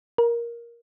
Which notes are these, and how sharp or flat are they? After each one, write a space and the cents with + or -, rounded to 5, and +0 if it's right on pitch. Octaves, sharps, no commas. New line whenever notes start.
A#4 +10